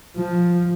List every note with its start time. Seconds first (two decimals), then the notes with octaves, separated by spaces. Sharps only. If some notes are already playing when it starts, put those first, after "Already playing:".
0.16 F3